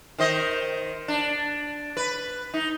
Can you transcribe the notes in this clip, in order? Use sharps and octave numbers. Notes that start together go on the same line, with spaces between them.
D#3 C5 D#5
D4
B4
D#4